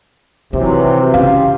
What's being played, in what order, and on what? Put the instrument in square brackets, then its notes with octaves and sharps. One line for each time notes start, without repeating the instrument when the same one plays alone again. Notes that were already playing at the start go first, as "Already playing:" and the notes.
[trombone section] C3 [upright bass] D#3 [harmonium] E3 F#3
[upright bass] C#3 [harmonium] F4 G4 [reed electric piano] F5